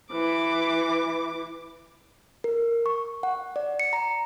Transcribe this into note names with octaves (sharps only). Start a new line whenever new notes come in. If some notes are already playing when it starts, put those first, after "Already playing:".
E3 D6
A#4
C#6
F#5
D5
C#7
A#5